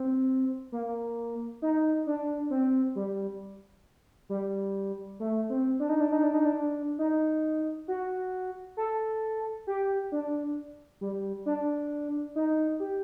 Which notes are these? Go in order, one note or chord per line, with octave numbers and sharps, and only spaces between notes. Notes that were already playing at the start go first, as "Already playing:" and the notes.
Already playing: C4
A#3
D#4
D4
C4
G3
G3
A3
C4
D4
D#4
D4
D#4
D4
D#4
D4
D#4
F#4
A4
G4
D4
G3
D4
D#4
G4